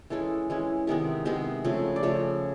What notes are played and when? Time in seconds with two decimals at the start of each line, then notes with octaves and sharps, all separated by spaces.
0.10 E3 G#3 C#4 A4
0.50 E3 G#3 C#4
0.87 C3 D#3 G#3 B3 A#4
1.25 C3 D#3 G#3 B3 C5
1.65 C#3 F3 A3
1.96 D5
2.03 C#3 F3 A3 C#5